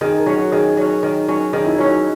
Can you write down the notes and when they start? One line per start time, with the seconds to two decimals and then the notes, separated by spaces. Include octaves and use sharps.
0.01 D#3 G#4
0.18 A#4
0.26 F#3 C#4
0.36 F#4
0.52 D#3 G#4
0.77 F#3 C#4
1.03 D#3
1.28 F#3 C#4
1.53 D#3 G#4
1.66 E4
1.78 F#3 C#4 F#4
1.91 D#4